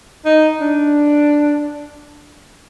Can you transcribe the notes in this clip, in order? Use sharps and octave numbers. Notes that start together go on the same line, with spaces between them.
D#4
D4